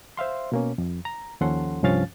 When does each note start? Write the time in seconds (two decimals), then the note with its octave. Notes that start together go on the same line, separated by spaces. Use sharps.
0.17 C5 E5 F5 C6
0.52 B2 A#3 C#4
0.78 F2
1.05 A#5
1.41 D#2 F3 C#4 A4 F#5 C6
1.83 C2 G2 F3 C#4 F5 A6